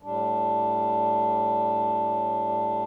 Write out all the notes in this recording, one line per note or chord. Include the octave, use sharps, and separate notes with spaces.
A2 G3 D4